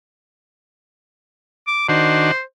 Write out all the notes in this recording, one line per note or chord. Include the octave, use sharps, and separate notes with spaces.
D6
D#3 D4 F#4 C5